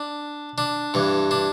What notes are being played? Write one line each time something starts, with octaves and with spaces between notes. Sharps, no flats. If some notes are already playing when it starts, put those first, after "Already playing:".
Already playing: D4
D4
G2 E3
D4